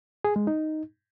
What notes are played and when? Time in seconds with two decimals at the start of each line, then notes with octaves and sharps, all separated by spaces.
0.24 G#4
0.36 G#3
0.47 D#4